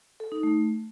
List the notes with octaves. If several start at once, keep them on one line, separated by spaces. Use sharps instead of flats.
A4
D#4
A3